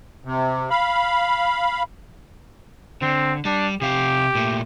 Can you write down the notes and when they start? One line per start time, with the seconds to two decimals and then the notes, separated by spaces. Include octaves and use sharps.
0.25 C3
0.70 F5 B5
3.02 D3 C4
3.45 G3 D4
3.82 C3 G4 F5
4.35 A#2 A3